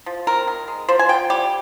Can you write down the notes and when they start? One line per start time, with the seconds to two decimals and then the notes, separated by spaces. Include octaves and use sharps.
0.06 F3
0.27 C4 A#4
0.47 D#3
0.68 G#3
0.89 F3 C5
0.99 G#5
1.09 F3 G5
1.30 G3 G4